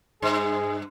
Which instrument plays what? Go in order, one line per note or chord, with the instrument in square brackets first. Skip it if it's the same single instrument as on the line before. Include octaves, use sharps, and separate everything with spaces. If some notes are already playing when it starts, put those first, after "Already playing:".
[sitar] G2 [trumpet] G#4